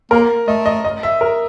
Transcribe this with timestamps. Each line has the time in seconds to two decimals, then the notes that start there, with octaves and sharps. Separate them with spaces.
0.11 A#3 A#4
0.48 A3 D#5
0.66 D#5
0.85 D#5
1.03 E5
1.21 A#4